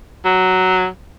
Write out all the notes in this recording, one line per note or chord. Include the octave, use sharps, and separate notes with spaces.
F#3